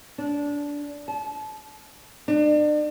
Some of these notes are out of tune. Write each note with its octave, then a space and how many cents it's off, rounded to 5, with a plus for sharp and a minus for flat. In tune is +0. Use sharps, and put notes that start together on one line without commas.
D4 -20
A5 -30
D4 +35